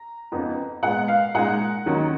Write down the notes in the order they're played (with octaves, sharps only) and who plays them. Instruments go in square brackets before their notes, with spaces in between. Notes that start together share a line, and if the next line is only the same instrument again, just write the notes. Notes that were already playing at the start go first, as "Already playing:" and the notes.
Already playing: [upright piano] A#5
F2 C#3 F3 B3 D#4
A#2 G#3 B3 F#5
F5
A#2 G#3 D#4 F#5
D#2 D#3 F#3 C#4